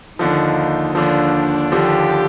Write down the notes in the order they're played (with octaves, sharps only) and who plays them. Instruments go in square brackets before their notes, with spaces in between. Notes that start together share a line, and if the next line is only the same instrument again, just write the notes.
[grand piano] D#2 D3 F3 [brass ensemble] D#4
[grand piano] D#2 D3 F3 [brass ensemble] D4
[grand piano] D#2 D3 F3 [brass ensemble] G4